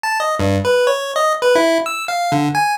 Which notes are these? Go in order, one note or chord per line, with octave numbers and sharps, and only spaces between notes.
A5
D#5
G2
B4
C#5
D#5
B4
E4
E6
F5
D3
G#5